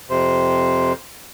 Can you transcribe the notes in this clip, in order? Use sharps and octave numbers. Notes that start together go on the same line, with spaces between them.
F2 C3 C5